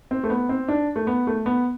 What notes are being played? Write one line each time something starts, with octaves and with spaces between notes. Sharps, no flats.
C4
A3
B3
C4
D4
A3
B3
A3
B3